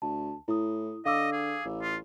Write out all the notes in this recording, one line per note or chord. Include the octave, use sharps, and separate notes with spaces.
D2 A5
A2 E4 D#6
D3 D#5 F5 D6 E6
G#4
A1
F4